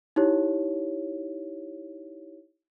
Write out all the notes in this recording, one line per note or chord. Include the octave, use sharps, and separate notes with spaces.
D#4 E4 G4 C#5